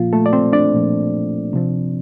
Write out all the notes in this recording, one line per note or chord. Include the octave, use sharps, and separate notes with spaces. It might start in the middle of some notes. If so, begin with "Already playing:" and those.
Already playing: A#2 F3 A#3 F4
A3 A4
D5
C4 C5
D4 D5
A#2 F3 A#3
C3 F3 C4